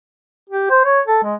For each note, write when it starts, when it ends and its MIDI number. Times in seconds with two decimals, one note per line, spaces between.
0.49 0.70 67
0.70 0.84 72
0.85 1.00 73
1.07 1.18 69
1.23 1.35 56